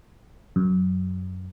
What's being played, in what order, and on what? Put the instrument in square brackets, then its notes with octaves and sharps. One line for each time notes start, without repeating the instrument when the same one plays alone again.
[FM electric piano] F#2